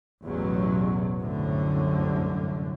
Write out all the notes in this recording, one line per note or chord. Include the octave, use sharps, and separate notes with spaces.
A1 E2 B2 F#3
C2 F#2 A2 D3